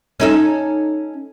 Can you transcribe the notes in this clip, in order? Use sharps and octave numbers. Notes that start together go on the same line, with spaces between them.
C#4 D#4 A4